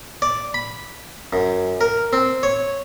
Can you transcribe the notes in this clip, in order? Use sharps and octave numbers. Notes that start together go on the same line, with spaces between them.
D5
B5
F#2
A#4
C4
C#5